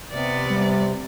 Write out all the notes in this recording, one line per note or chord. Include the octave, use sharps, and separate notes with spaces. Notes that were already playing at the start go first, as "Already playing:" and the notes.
C3 B3 D5
G3